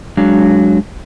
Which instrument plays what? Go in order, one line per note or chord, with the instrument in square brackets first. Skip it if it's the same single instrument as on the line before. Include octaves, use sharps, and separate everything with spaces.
[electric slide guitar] F#3 G#3 D4 F5